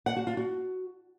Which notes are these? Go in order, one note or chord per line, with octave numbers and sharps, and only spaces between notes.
F#5
F#4
F4
F#4